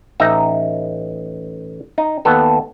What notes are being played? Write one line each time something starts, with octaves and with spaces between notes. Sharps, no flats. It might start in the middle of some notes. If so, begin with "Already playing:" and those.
A1 D#4 E5 A#5
D#4
D#2 B3 A4